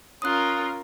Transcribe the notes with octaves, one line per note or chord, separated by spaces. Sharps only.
C#4 F4 A#4 D#6 F#6